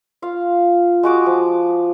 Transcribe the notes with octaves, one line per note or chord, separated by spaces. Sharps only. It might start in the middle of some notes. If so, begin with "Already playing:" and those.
F4 F5
G#3 F#4 D6 D#6
F3